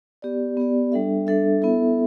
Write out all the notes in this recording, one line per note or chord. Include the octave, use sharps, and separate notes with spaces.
B3 G4 D5
B3 G4 D5
G3 D4 A4 E5
G3 D4 A4 E5
B3 E4 A4 E5